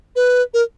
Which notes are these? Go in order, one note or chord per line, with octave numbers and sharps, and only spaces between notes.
B4
A#4